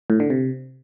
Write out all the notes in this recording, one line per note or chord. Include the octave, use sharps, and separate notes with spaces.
A2
D3
C3